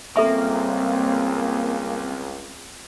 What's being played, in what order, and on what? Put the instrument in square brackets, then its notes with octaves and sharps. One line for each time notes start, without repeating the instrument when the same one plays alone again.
[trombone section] C#2 [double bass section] G3 C4 [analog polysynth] A#3 [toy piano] A4 E5 C#6